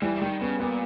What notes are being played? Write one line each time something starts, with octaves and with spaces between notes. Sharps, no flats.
E3 G3
E3
D#3 G3
C#3 B3
A#2 B3